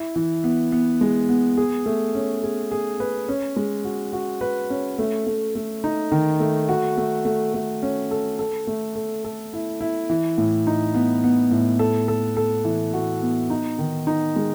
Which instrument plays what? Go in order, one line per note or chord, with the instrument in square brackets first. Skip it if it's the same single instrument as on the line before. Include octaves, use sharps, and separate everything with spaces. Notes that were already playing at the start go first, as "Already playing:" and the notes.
Already playing: [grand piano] E4
E3
B3
B3
G#3
B3
G#4
A3
C#4
G#4
G#4
B4
C#4
G#3
F#4
F#4
B4
C#4
A3
A3
A3
D#4
D#3
A3
F#4
A3
A3
A3
C#4
A4
A4
A3
A4
A4
E4
E4
E3
A2
D#4
B3
B3
A2
A4
A4
A4
E3
F#4
B3
D#4
D#3
D#4
G#3